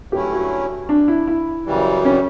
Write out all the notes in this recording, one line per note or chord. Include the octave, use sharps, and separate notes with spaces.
G2 F#3 A3 C#4 E4 G4
F#4
D4
E4
E4
F#2 C#3 E3 G3
C#4